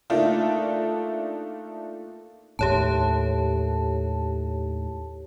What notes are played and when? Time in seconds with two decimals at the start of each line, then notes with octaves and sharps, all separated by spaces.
0.10 A3 A#3 D4 D#4 F4 A4
2.59 D#2 A2 G4 C#5 A5